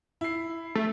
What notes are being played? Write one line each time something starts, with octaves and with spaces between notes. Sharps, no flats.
E4 C7
A3